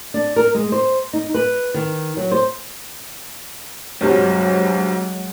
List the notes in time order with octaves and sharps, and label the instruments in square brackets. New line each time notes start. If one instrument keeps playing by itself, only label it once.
[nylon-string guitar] D4
A#4
G#3
C5
D#4
B4
D#3
F#3
C5
[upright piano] B1 G2 C3 [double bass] F#3 G#3 [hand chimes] F#4 C#5